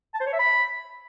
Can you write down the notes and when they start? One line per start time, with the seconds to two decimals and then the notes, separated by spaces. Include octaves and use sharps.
0.14 A5
0.20 C5
0.27 C#5
0.33 E5
0.39 B5